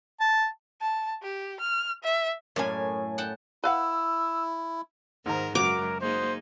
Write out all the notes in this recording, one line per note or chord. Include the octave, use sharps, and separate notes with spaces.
A5
A5
G4
F6
E5
F#2 A2 A#3 C#4 G#5
F#5 G5 A5
E4 B4 F5 F#5 E6
G#2 D#3 A#4 C5 A#5
F#2 C#3 G#3 F#4 A#4 D6 F7
A#3 D#4 G#4 C5